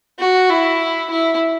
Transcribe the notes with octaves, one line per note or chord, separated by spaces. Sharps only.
F#4
E4
E4